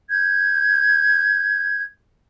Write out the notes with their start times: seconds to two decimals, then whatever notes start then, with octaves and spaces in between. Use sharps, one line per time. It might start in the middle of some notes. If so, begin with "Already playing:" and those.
0.11 G6 G#6